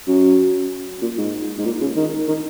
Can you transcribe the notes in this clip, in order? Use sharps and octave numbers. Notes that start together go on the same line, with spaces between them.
F#2
A#2
G#2
G#2
A#2
C#3
D#3
D#3